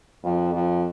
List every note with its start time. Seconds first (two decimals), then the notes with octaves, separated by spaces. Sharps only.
0.23 F2
0.53 F2